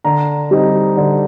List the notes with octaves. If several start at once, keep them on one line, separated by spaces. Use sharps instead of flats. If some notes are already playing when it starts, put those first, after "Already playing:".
D3 A#5
G3 C4 D#4
D3